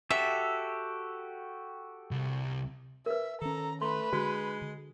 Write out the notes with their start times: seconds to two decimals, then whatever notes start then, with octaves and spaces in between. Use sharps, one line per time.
0.11 F#4 G4 A4 E5
2.11 C2
3.06 A#4 B4 E5
3.42 D#3 C#4 A4 A#5
3.82 A3 B4 C6
4.13 D3 G#3 F#4
4.62 D3